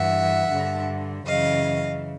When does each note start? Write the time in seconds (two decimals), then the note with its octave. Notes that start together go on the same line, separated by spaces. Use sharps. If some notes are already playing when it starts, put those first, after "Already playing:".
Already playing: G2 E3 E5 F#5
0.51 G2 D3
1.25 F#2 C#3 E3 D#5 F5